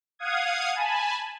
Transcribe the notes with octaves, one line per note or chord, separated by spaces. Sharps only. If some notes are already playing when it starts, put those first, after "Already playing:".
F5 F#5 D#6 G#6
G#5 A5 B5